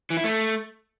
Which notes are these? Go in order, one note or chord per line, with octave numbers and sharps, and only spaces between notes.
E3
E4
A3